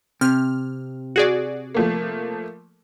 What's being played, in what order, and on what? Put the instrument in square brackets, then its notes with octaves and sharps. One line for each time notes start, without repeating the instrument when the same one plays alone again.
[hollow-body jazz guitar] C3 [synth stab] F6
[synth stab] F#4 G#4 D5
[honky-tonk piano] F3 A3 A#3